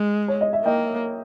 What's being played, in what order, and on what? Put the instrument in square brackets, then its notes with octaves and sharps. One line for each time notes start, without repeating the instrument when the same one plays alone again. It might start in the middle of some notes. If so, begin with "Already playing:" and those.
Already playing: [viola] G#3
[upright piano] C#5
D#5
E5
[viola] A#3 [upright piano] D#5 G5